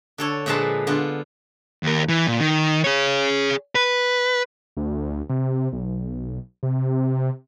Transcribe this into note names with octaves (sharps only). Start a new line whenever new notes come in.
D3 A4 C#5
A#2 D3 F3 G#3 B4 A5
D3 B3 F4
D#2 A#4
E3
A#2
D#3
G#4 C#5
B4
D2
C3
B1
C3